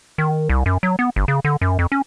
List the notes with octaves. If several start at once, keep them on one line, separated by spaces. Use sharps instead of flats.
D#3
C2
F#2
F#3
B3
G1
C#3
D3
F#2
F2
C#4